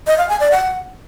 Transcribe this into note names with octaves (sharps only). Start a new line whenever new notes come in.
D#5
F5
G#5
D5
F#5